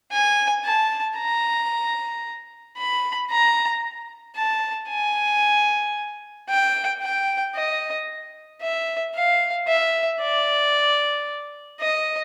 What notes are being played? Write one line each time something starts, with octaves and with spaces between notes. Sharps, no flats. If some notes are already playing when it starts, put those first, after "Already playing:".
G#5
A5
A#5
B5
A#5
A5
G#5
G5
G5
D#5
E5
F5
E5
D5
D#5